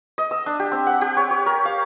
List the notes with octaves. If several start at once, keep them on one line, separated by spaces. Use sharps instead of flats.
D#5
E6
D4
G4
C4
F#5
G4
C#5
C#5
A#4
F5